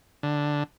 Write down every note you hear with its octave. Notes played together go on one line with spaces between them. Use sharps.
D3